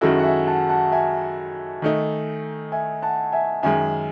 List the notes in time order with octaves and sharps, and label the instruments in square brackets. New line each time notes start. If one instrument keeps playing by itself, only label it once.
[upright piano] F#2 D#3 G#3 C#4 E4 [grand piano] F#4 A4
[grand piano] F#5
E5 G#5
F#5 A5
F#5 A5
E5 G#5
[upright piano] D#3 A3 D#4
[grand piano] E5 G#5
F#5 A5
E5 G#5
[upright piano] F#2 D#3 G#3 [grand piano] E5 G#5